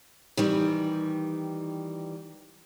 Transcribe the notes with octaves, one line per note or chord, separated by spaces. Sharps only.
D#3 E3 G3